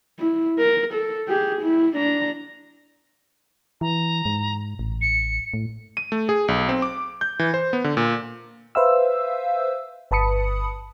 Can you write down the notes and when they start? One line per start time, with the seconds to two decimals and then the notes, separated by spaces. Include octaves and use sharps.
0.19 E4
0.58 A#4
0.93 A4
1.29 G4 G#4
1.62 E4
1.96 D4 A#5
3.81 E3 A#5
4.26 G#2
4.79 A1
5.01 C#7
5.54 A2
5.97 D#7
6.12 A3
6.29 G#4
6.48 B1
6.69 C4
6.82 D6
7.21 G6
7.39 E3
7.54 C5
7.73 B3
7.84 D3
7.97 A#2
8.75 B4 C5 E5 F5 E6
10.11 G1 B4 A5 B5 D#6 C#7